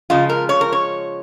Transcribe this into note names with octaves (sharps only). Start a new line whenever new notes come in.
C#3 F3 G#3 F4
A#4
C#5
A#4
C#5